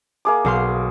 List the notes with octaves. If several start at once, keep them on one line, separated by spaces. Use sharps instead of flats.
A#3 G#4 D6
B1 F5 C6